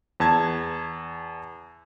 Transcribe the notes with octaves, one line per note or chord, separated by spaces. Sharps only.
E2 A5 G#6